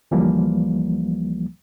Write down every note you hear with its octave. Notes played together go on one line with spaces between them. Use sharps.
D2 E3 F3 G3 A#3